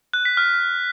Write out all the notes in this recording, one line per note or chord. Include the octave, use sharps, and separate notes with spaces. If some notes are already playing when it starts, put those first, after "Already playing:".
F#6
B6
F6